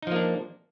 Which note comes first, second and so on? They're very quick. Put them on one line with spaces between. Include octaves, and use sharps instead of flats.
D#4 F3 A#3 D4